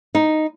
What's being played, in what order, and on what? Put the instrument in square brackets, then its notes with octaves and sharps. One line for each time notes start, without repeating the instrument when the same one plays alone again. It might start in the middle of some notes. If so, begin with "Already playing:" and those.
[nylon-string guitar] D#4